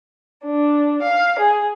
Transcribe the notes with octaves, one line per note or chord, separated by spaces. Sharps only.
D4
F5
G#4